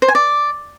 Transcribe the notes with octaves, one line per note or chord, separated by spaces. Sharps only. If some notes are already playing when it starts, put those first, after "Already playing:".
C5
G#5
D5